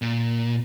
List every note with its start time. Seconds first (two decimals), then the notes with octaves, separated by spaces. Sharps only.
0.02 A#2